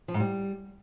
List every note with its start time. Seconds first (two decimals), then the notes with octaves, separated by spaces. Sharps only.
0.08 F3
0.14 G#2
0.20 G3